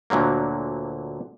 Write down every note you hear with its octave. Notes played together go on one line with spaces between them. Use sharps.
D2 A#2 D3 F#3 A#3